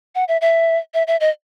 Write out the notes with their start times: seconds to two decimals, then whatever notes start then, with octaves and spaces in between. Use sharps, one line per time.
0.15 F#5
0.28 E5
0.41 E5
0.94 E5
1.07 E5
1.20 D#5